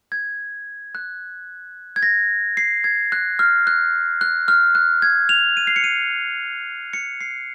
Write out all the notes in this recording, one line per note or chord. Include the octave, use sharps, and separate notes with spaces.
G#6
F#6
G#6
A#6
C7
G#6
F#6
F6
F#6
F#6
F6
F#6
G#6
F7
D#7
C7
C#7
D#7
C#7
C7